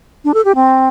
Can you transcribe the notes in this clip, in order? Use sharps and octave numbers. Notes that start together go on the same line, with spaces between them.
D4
A4
G4
C4